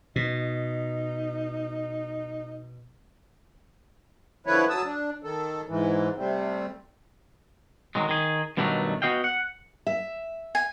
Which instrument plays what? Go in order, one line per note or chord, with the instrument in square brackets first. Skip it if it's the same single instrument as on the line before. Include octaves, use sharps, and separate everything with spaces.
[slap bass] B2 [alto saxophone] D#4
[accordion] D3 F3 E4 B4 C#5
F#3 A5 D#6 E6
D4
D#3 A4
G#2 E3
C3 G3 A3 C4
[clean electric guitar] D#3 F#3 G#3
D#3 G#4
G2 B2 D#3 F#3 A3 D4
B3 F#4 D#5 F5 G5
F#5
[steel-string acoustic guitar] E5
[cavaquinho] G#5